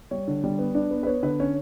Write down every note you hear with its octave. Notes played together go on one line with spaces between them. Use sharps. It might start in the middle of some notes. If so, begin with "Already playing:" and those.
G3 C#5
D3
G3
B3
D4
B3
B4
B3 C#5
D3 B4
C#4 C#5